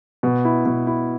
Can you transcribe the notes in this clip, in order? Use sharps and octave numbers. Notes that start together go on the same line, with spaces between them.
B2
E4
B2
E4